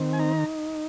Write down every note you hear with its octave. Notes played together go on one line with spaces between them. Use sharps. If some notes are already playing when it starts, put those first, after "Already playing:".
Already playing: D#3 C4
G#5
D#4 A#5